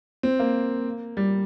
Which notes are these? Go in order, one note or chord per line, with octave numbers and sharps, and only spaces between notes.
C4
A#3
G3